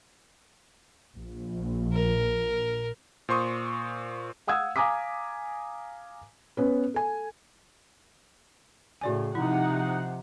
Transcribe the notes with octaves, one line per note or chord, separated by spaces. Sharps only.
A#1
A#4
A#2 C5 C6 C#6 D#6
F5 F#5 D#6 E6 G#6
F5 G#5 A#5 D6 D#6 B6
B3 C#4 B4
A4 G#5
A2 C#3 F#4 D5 G#5
C3 F3 D#4 E4 F#5